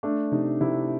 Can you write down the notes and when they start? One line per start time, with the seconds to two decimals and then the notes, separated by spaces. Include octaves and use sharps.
0.03 A3 D4
0.32 C3 D#4
0.61 C3 E4